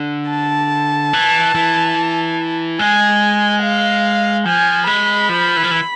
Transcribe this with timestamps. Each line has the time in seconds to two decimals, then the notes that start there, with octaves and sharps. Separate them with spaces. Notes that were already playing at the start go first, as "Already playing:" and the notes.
Already playing: D3
0.30 A5
1.13 E3
1.55 E3
2.79 G#3 G#5
3.63 F5
4.45 F3 G#5
4.87 G#3 B5
5.29 F3
5.57 E3
5.63 F3
5.71 E3